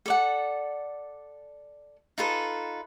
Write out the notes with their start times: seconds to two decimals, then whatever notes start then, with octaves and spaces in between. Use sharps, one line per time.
0.06 A4 D5 F#5
2.18 D#4 F4 A4 B4